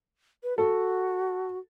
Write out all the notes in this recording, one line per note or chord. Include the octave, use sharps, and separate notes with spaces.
B4
F#4 A4